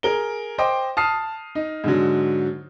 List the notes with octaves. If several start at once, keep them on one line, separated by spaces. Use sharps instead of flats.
G#4 A#4 G7
C5 D#5 G5 C6 D6
A5 D#6 F6 C7
D#4
G#2 D3 F#3